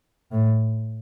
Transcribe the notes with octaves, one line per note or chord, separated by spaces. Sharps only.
A2